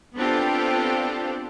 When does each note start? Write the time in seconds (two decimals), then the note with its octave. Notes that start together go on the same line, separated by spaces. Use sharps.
0.16 B3 C4 D4 F4 G4 A4